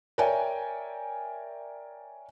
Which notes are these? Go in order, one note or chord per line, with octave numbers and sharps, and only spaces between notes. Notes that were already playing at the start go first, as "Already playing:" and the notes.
A#4 C#5 D5 E5 G5 G#5